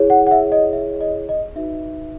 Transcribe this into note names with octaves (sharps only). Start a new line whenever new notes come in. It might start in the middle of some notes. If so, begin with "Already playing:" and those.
Already playing: E4 G#4 C#5
F#5
F#5
E5
D#5
E5
D#5
D#5
D#4 F#4 B4 E5